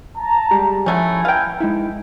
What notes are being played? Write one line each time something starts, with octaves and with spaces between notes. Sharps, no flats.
A5 A#5
G3 G#3 G4
F3 F#3 A3 C#4 E4 G#5
B4 F5 G5 A#5
G#3 D#4 E4